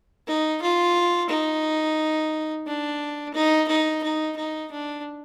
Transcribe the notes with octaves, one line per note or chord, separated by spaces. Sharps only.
D#4
F4
D#4
D4
D#4
D#4
D#4
D#4
D4